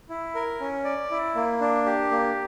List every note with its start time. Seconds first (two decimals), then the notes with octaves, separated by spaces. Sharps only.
0.09 E4
0.35 A#4
0.60 C#4
0.85 D5
1.11 E4
1.35 A#3
1.61 D4
1.86 G4
2.11 A#3